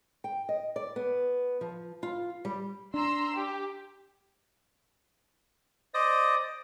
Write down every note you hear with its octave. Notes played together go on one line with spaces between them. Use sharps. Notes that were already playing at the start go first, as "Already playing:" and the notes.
G5
D#5
D5
B3
F3
F4
G3
D4 A#5 C6 E6
G4
C5 D5 D#5 D#6